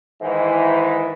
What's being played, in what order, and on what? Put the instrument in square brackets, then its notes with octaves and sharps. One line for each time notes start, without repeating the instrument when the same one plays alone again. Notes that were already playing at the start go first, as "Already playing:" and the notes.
[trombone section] G#2 D#3 E3